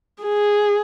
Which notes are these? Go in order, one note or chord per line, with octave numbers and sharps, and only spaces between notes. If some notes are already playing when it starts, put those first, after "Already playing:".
G#4